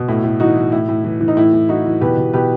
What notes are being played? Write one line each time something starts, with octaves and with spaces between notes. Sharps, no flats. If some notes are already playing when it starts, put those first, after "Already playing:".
Already playing: B2
A2 E4
A2
E3 D#4 F#4
E3
A2 E4
A2
E3
E3
D#4
A2 E4
A2
E3 D#4 F#4
E3
B2 G4 B4
B2
B2 G4 B4